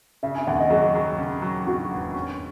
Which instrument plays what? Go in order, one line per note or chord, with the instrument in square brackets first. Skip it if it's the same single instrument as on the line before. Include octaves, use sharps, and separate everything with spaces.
[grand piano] C#3 [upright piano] E5
[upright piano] G#5
[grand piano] D#2 [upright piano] F#5
[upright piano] D#5
[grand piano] F#3 [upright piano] G#4
[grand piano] F#3
C#3
F#3
[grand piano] F#3 [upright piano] F#4
[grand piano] E1
C#4